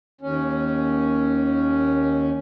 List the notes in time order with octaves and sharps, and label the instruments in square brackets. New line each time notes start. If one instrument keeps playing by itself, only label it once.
[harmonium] D#2 C#4